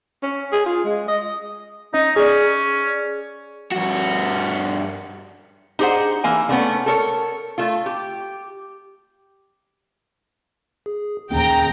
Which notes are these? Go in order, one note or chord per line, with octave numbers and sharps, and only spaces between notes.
C#4
G#4
F4
G#3
D#5
C#4 D#4 D#5
C#4 G#4 D5
G2 F#4
D#4 G4 G#4 C5 F#5
E3 A#3 G#5
D3 A3 B3 C#4
A4 A#4 C#5
A3 F4
G4
G#4
D#2 A#3 C#4 G#4 G5 A#5